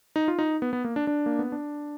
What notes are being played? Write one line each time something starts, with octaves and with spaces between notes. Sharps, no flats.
D#4
F4
D#4
B3
B3
A#3
D4
D4
A#3
B3
D4